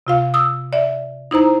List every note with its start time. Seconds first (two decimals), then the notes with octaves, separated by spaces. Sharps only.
0.07 C3 F4 F5
0.34 D#6 E6
0.73 D5 E5
1.31 D#4 E4 C5 A#5